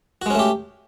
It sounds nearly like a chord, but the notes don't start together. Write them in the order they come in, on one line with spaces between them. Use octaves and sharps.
F#4 G#3 C#4 A3 G4